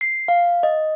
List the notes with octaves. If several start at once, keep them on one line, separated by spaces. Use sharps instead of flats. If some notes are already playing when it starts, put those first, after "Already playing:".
C7
F5
D#5